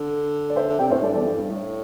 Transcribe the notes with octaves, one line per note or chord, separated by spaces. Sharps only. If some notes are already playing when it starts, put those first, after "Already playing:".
Already playing: D3
D5
C5 E5
D3
C3 D5 G5
A2 C5 E5
G2 A4 D5
E2 A4 D5
G2
A2